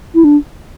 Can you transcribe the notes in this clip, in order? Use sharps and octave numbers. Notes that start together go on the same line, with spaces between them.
E4
D4